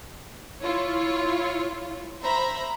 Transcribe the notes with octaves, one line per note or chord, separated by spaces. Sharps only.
E4 F4 C#5
C5 E5 A#5 B5